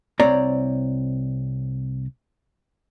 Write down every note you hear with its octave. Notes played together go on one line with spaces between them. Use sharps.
C2 C4 C#5 D5 A#5